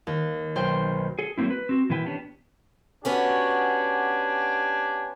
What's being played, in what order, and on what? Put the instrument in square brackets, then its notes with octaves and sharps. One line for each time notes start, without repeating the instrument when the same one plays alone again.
[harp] D#2
B1 C5 G5
[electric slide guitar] G#4 A4
F#3 A3 A#3 C4 E4
B4
C4 F#4
A#2 E3 E4 B4 G5
B3 C#4 D4 G4
[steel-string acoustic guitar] B3 C#4 F#4 [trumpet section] D4 G4 G#5